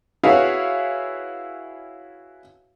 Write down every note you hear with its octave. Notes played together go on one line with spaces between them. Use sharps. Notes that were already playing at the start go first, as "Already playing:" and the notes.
E4 F#4 G#4 B4 C#5 F5